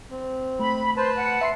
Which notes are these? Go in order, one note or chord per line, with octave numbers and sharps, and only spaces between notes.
C4
A3 B5
B4 C5 A5
F#5
E5 C6 C7